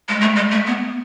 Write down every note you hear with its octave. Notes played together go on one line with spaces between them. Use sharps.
G#3
A3
G#3
A3
B3